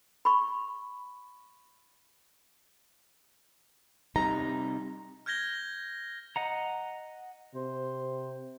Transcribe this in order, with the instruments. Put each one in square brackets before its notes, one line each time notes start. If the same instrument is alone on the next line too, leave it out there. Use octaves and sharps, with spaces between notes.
[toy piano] B5 C#6
[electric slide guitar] C3 G3 D#4 [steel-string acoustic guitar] A#5
[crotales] F6 G6 G#6 A#6 G7
[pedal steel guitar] D#5 F#5 A#5
[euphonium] C3 [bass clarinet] C5